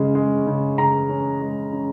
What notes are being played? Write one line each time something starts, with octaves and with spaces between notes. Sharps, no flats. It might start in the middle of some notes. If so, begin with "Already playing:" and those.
Already playing: C#3 G#3 C#4
G#3
C#3
C#3 A#5
C#4
G#3
C#4